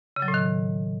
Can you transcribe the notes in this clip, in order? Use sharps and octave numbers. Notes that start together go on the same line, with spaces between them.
C#3
F#3
A2
D#3